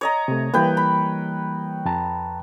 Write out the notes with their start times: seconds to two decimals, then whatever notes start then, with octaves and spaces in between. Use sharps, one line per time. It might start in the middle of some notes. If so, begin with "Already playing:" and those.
0.01 C#5 D#5 A#5
0.28 C3 A3
0.54 E3 G3 A#3 B4 G5
0.77 B5
1.85 F2 A5 A#5